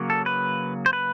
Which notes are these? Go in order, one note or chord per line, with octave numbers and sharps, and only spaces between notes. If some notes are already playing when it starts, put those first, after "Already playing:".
Already playing: C#3 F#3 A#3
A4
B4
C5
B4